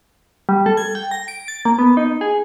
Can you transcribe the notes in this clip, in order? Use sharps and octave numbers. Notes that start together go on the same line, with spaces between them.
G3
A4
G#6
G5
A#6
D7
A6
A#3
B3
D#4
G#4